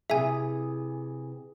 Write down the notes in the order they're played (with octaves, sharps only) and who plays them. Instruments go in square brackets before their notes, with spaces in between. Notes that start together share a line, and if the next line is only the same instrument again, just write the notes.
[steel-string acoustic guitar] C3 E3 [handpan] G#4 [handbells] E5 G#5